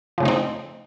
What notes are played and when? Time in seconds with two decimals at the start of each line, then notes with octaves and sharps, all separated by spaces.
0.18 F3
0.20 C#3
0.23 A3
0.25 D#4
0.28 C4